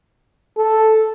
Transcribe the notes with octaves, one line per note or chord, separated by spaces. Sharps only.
A4